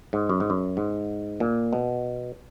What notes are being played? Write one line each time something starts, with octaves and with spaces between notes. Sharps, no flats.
G#2
F#2
G#2
F#2
G#2
A#2
B2